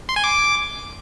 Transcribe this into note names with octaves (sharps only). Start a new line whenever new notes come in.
C6
G#5
D6